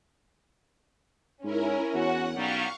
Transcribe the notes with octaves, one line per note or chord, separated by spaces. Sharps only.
G#2 C#4 E4 A#4
E2 F#4 F#5
B1 F#3 G3 F5 C#6